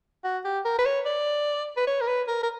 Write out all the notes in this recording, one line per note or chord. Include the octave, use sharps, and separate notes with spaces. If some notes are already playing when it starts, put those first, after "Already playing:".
F#4
G4
A#4
B4
C#5
D5
B4
C#5
A#4
B4
A#4
A#4